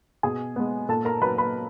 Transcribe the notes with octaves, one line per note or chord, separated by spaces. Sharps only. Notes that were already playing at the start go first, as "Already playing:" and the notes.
B2 G#4 G#5
G#3 B3
A#2 A4 A5
A#4 A#5
F#3 A#3 B4 B5
B4 B5